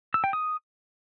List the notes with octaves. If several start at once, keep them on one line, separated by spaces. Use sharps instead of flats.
E6
G5
D#6